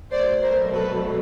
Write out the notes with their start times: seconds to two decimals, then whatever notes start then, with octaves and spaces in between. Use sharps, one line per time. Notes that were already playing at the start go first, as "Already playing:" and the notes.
0.11 B2 F#3 A3 C5 D5
0.42 A#4 C5
0.73 A4 B4